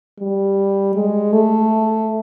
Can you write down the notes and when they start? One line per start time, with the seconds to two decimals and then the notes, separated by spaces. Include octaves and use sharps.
0.19 G3
0.95 G#3
1.32 A3